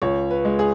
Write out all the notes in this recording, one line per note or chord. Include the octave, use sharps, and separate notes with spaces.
C#2 C#5
B4
G#3
G#4